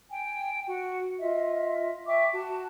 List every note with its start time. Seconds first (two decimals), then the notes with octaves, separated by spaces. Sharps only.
0.10 G5 G#5
0.67 F#4
1.19 F4 D#5 E5
2.07 E5 G5 C#6 D6
2.34 F#4 A5